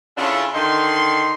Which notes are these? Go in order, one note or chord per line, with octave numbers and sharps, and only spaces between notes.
C#3 C#4 D4 E4 F4 A4
D3 D#3 D#4 C6